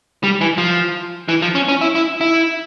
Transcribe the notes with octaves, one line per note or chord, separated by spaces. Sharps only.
G3
E3
F3
E3
F3
C#4
C#4
E4
E4
E4